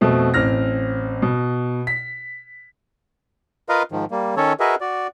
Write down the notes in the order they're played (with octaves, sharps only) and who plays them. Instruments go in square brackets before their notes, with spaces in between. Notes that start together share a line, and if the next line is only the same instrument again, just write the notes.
[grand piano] F2 B2 A3 C4
A1 C4 F6 A#6
B2
B6
[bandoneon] F4 A#4 B4 D#5 F5
G#2 D#3 F3
G3 A#3
D#3 C#4 A4 C#5
F#4 G#4 A#4 B4 D#5 E5
F#4 D5